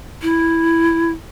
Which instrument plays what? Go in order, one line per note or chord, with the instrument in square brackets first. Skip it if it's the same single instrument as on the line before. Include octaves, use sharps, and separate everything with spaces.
[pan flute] E4